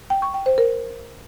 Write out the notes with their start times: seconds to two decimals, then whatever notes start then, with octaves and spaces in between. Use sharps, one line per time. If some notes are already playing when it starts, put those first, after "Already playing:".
0.10 G5
0.22 C#6
0.34 G5
0.46 C5
0.58 A#4